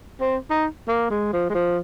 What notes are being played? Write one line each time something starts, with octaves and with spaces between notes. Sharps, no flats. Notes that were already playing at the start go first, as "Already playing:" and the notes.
C4
D#4
A#3
G#3
F3
G#3
F3